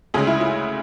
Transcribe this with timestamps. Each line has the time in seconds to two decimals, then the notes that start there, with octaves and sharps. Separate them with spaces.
0.14 D2 C#3 G#3 G#4
0.27 E4
0.40 E4